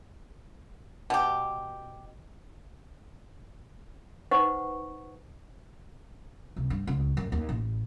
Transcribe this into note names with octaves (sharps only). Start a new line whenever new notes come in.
B2 G4
D#4 B4 C5 F#5 C#6
C2
G2
C#2
F#2
D#2
A1